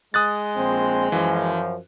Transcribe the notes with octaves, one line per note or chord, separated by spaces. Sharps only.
G#3 D#6 F#6 A6
A#1 C4
F#2 E3 F3